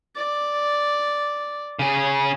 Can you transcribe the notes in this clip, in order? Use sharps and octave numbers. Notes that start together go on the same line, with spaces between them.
D5
C#3 G#4